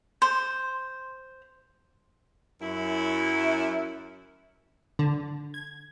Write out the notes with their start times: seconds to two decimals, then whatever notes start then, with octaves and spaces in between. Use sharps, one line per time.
0.22 C5
2.61 F#2 E4
4.99 D3
5.54 G#6